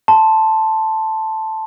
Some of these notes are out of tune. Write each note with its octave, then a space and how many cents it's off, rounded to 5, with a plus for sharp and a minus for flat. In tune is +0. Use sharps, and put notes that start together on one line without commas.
A5 +0 C6 +0